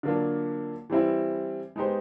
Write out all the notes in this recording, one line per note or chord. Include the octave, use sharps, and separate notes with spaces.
D3 F#3 A#3 D4 F4
E3 G3 C4 E4
G#3 B3 D#4 G4 C5